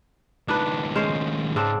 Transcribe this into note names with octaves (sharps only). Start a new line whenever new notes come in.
C#2 D#3 D4 B4
G#3 C#4 C5
G#2 C#3 C4 D4